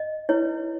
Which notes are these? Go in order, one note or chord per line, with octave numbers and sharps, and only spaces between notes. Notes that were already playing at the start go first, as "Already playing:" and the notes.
Already playing: D#5
E4 B4 C#5